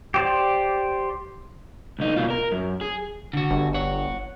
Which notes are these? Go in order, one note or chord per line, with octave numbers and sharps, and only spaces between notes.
G4 C5 D5
C2 D#4
B2 F4
A#4
F#2
G#4
D3 F#4
G1
C#5 F#5